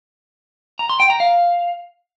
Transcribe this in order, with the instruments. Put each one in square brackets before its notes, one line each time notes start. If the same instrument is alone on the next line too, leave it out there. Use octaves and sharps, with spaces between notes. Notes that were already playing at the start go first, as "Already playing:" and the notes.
[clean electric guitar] A#5
C6
G5
A#5
F5